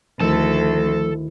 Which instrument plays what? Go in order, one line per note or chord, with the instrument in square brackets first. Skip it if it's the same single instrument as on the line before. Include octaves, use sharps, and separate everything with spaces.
[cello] D2 [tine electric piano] D#3 E4 [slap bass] F3 A3 [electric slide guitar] A4 A5